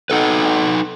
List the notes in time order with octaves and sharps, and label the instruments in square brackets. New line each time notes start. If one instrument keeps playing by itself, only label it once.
[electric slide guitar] D#4 A4 B4